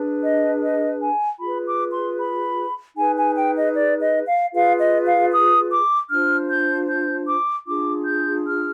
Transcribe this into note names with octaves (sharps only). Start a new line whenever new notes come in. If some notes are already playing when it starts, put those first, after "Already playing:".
Already playing: D4 G#4 B4
D#5
D#5
G#5
F4 G#4 B4 B5
D6
C6
B5
D#4 G#4 B4 G#5
G#5
G5
D#5
D5
D#5
F5
F4 G#4 B4 F5
D#5
F5
D#6
D6
D4 F4 C5 F6
G6
G6
D6
D4 F4 G#4 D6
G6
F6